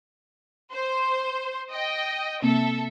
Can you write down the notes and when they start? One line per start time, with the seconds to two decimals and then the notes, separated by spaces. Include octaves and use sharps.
0.74 C5
1.71 D#5 G5
2.42 C3 A#3 C4 A4 E5